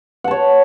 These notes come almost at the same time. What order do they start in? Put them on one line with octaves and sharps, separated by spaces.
F#5 A5 C#5